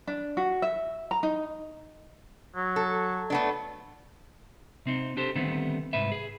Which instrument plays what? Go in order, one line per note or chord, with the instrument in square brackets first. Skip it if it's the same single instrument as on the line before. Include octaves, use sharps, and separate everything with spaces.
[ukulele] D4
F#4
E5
A#5
D#4
[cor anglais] F#3
[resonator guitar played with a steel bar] A4
A3 B3 D4
[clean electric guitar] C3 C4 D#4
D4 G4 A4 C5
D3 D#3 G3 A3 B3 C4
C2 G#2 B4 E5
G#4